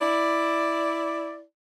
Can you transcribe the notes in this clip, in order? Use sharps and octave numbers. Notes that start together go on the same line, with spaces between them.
E4 D5